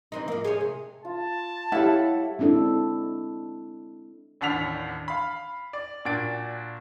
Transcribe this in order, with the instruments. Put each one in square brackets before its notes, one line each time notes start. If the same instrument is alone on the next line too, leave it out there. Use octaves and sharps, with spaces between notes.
[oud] E3 C4 D#4
F3 A#3
G#4 C5 C#5
C3
[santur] F4 [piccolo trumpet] A5
[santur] G3 C#5 E6 [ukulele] E4 A4 [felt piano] F5 F#5
[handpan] G#3 C4 D4 E4 A4
[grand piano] A1 D#2 D4 F#5 B6 F7
F5 B5
D5
A#2 D4 F#4 A6 D7